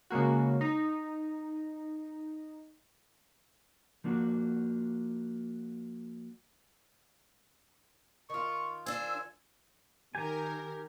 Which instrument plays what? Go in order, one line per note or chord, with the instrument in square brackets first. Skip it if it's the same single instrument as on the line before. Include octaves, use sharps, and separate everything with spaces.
[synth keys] C#3 G#3 A#3 F#4
D#4
[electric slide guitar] F3 A#3 D4 F#4
[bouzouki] D#3 F4 [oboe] C#6
[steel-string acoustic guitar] D4 C5 [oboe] G#5 [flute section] E6
[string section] D#3 A#4 [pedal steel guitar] G4 G#5